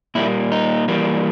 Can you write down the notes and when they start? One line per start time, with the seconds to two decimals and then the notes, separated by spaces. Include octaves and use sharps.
0.15 A#2 G3 A#3 E4
0.52 D#4
0.88 E3 G3 A#3